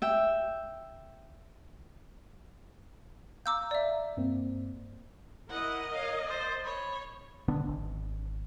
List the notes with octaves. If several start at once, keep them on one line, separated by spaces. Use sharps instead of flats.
E5 G5
F5 A#5 D6 E6 G6
D5 E5
G2 A#3 C4
E4 A#4 D#5 F#5
C#5 F5
C5 A6
C#5 B5
A1 D3 B3 D4
G#1